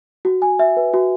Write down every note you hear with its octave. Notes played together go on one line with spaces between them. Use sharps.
F#4
G#5
E5
B4
F#4